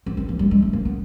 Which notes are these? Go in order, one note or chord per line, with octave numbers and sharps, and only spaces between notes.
C4
C4
A#3
G3
G#3
A3
A#3
B3